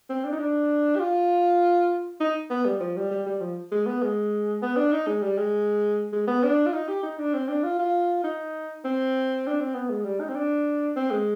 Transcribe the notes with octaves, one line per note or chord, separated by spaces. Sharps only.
C4
D4
D#4
D4
G4
F4
D#4
B3
G3
F3
G3
G3
G3
F3
G#3
B3
G#3
B3
D4
D#4
G#3
G3
G#3
G#3
B3
D4
F4
D#4
G4
D#4
D4
C4
D4
F4
F4
D#4
C4
D4
C4
B3
G#3
G3
D#4
C4
D4
C4
G#3